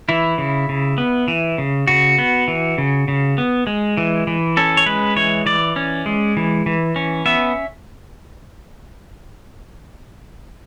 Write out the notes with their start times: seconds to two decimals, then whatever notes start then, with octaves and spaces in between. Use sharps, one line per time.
0.09 E3 E4
0.38 C#3
0.69 C#3
0.98 B3
1.28 E3
1.58 C#3
1.87 C#3 F#4
2.18 B3
2.48 E3
2.78 C#3
3.08 C#3
3.38 B3
3.67 G#3
3.97 E3
4.27 E3
4.57 C#4 A4
4.77 C#5
4.86 G#3 B4
5.16 E3 C#5
5.46 E3 D5
5.76 C#4
6.06 G#3
6.37 E3
6.66 E3
6.96 C#4
7.26 B3 E5